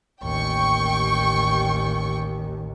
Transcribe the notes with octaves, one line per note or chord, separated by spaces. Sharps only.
A1 D#2 G5 C#6